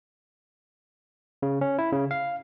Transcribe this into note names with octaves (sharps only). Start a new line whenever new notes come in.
C#3
C#4
E4
C#3
F5